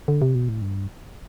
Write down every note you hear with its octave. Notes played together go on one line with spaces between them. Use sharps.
D3
C3
B2
A2
G2